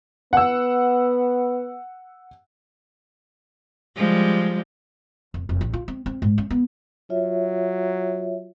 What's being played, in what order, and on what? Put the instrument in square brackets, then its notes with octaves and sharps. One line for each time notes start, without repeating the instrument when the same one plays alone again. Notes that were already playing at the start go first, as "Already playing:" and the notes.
[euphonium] B3 [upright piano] F#5 E6
[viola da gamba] F3 G3 G#3
[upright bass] F1
F1
A1
F4
C4
C4
G#2
C#4
B3
[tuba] F#3 [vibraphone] F4 C#5 E5